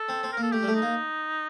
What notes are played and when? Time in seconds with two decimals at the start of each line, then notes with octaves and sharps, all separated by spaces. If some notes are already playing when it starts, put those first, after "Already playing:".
Already playing: A4
0.09 C4
0.23 C4
0.33 A#3 A#4
0.42 A4
0.52 A3 G4
0.63 G3
0.68 A3
0.75 D#4
0.82 A#3